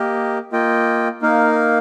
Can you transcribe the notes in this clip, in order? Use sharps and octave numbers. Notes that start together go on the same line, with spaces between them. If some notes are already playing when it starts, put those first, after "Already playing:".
Already playing: A#3 G4 A#4 D#5
A#3 F4 D#5 G5
A#3 D#4 A#4 F5